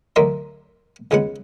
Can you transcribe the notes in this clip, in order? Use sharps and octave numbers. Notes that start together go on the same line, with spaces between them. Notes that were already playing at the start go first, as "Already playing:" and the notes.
D2 F#3 A#4 D#5 E5 C6
C#2 C#3 G#3 B3 F#5